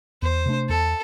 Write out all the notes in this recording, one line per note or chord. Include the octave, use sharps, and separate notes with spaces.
E2 C5
C3 A3 D4
E2 A4